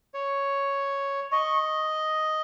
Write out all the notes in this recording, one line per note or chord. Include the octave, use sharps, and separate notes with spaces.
C#5
D#5 C#6